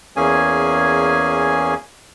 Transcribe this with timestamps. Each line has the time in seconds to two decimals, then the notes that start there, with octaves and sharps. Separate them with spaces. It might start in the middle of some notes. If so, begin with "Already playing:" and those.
0.16 E2 A#3 C#4 G#4 G#5